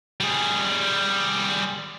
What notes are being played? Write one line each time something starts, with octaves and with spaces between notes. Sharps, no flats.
G3 G#4